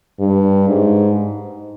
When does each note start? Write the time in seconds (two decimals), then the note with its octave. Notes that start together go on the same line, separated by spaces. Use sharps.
0.20 G2
0.68 G#2